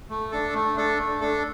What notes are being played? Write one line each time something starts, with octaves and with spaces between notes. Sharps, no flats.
A3
D4 A4
A3
D4 A4
A3
D4 A4